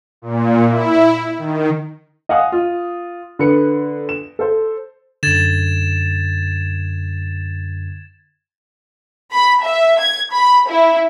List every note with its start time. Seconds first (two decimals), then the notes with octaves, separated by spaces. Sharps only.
0.22 A#2
0.68 E4
1.38 D#3
2.29 D#5 F5 F#5 G#5 D#6
2.52 F4
3.39 D3 B4 C#7
4.09 E7
4.39 A4 C5
5.23 F#2 D3 G#6 A6 E7
9.32 B5
9.63 E5
10.00 G#6
10.32 B5
10.68 E4